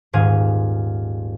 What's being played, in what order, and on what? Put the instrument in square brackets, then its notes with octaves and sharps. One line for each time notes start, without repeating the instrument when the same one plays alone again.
[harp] D#1 G#2 G#4 F5 G#6 D#7